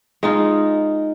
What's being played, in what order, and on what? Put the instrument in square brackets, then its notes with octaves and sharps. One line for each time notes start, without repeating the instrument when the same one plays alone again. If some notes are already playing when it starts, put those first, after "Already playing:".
[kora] G#3 D#4 F4